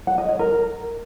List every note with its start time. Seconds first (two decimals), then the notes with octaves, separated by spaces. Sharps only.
0.07 F#5
0.18 D#5
0.29 C#5
0.39 A#4